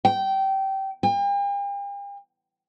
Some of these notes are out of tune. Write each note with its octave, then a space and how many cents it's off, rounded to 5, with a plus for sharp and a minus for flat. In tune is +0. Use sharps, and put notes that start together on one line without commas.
G5 -20
G5 +45